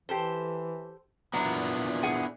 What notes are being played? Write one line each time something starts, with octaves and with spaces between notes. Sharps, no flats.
E3 G4 A4 C5
A#2 F#3 B3 D4 E4
G#4 F#5 G#5